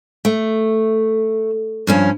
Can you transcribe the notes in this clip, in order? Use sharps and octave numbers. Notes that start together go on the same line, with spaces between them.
A3
G2 F3 C#4